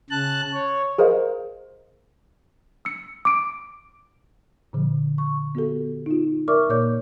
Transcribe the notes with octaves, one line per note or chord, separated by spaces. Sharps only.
C#3 A5 F#6
C#5
G#4 A#4 C5 D#5 F5
E6 C#7
D6 D7
A#2 D3 F3
C#6
B3 F#4 G4 A4
D#4 F4
A#4 D5 E5 C#6 D6 F6
A#2 A#3 C#5 D5 D6 G6